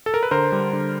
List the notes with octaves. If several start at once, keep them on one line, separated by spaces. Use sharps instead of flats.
A4
A#4
B4
D3 A#4 C5
G3
D3